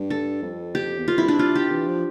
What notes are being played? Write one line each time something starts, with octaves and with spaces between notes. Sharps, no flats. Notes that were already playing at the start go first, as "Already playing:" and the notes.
Already playing: G2
A4
F2
G4
E2
F2 F4
F2 E4
G2 D4
C3 F4
G4
E3
F3